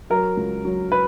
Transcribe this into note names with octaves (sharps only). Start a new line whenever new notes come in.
F#3 A#4
C#2
F#3
B4